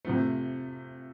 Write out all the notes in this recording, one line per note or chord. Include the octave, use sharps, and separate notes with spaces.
C3 F3 A3